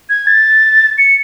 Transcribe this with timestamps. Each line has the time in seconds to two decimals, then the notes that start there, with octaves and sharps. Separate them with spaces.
0.10 G#6
0.27 A6
0.98 C#7